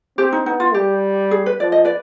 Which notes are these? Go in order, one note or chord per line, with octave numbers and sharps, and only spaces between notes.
C4 G4
D#4
B3 D#4
F4
G3 G4
G#4
B4
F3 D5
D#5
B4 D5